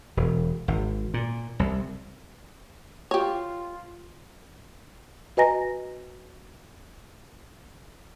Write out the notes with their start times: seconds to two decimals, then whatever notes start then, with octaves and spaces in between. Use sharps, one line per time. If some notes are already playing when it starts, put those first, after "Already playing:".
0.17 E1
0.68 G#1
1.14 A#2
1.60 C2
3.11 F4 G4 C#5
5.37 F#4 B4 D#5 G#5 A#5 A#6